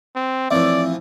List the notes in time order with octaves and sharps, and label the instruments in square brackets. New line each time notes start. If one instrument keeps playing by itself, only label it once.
[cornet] C4
[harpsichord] A2 E3 F3 [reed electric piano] C4 E5 [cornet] D5